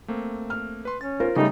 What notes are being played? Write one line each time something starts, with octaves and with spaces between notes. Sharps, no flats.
A3 A#3 C4
F6
B4 C6
C#4 A6
F4 A#4 C5
C#3 G3 A3 D#4